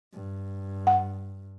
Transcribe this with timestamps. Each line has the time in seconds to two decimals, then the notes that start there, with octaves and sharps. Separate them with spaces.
0.13 G2
0.87 F#5